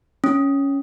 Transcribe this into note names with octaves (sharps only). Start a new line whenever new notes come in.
C#4